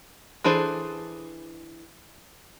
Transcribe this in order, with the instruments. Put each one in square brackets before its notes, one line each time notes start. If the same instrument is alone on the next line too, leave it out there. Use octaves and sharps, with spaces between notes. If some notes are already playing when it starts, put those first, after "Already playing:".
[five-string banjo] E3 D4 G#4 A4 C5